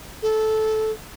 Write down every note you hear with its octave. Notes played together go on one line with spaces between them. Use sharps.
A4